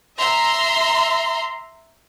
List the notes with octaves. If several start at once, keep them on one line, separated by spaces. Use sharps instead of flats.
E5 A#5 C6